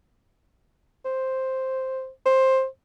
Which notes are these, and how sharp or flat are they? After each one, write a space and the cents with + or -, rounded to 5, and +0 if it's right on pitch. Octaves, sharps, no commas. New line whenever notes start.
C5 +5
C5 +10